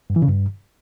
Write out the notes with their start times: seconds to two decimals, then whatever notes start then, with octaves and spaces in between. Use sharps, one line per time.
0.10 G2
0.16 E3
0.22 C#3
0.29 G2